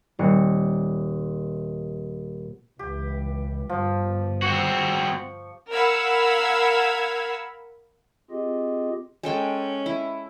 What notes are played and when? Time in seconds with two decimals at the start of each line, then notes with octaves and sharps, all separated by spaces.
0.19 D#1 C4 F#6 C#7
2.79 C#2 E3 G4
3.69 G1 G2 F3
4.42 C4 F#4 C#6
5.71 A#4 F5 F#5 B5 E6 G#6
8.31 C4 F4 G4 G#4 D#5
9.23 G#3 C#4 A4 G5
9.86 E4